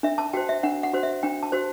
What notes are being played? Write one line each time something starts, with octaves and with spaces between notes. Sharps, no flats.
D4 E5
A5
F#4 C5 G5
E5
D4 F#5
F#5
F#4 C5
E5
D4 G5
A5
F#4 C5